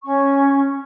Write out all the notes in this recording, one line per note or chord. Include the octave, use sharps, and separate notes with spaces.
C#4 C#6